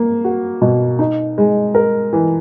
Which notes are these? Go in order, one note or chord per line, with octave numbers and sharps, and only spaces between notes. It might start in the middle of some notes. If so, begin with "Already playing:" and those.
Already playing: A#3
F#4
B2
D#4
G#3
A#4
E3